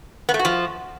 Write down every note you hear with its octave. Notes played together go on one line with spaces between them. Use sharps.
B3
A3
F#4
F3